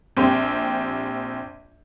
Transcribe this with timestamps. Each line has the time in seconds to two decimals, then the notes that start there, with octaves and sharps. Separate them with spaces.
0.17 A#1 C4 G4